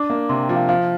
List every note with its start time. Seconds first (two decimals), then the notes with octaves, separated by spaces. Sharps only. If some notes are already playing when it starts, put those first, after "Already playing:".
Already playing: D4 D6
0.10 A#3
0.29 C3 C6
0.43 G5
0.49 F3
0.56 F5
0.69 F3 F5